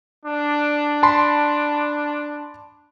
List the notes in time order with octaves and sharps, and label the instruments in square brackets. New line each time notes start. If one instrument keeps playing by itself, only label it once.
[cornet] D4
[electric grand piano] A5 B5 C6